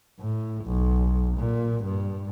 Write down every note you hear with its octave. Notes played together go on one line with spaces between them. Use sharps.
A2
B1
A#2
G2